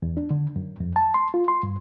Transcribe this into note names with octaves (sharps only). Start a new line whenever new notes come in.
E2
D4
D3
F#2
F2
A5
C6
F4
C6
G2